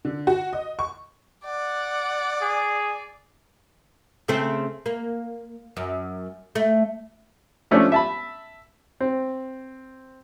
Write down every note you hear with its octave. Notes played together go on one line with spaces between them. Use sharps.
D3
F#4
D#5
C#6
D5 F#5
G#4
C#3 A3 C4
A#3
F#2
A3
F3 A3 C#4 D4
E5 A5 B5
C4